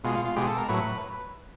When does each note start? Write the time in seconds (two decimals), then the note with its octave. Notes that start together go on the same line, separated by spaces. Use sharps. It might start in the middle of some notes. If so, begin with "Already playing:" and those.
0.04 B2 G#3 F4
0.15 F4
0.25 F4
0.36 B2 G#3 G4
0.47 A4
0.57 A#4
0.69 A2 F#3 B4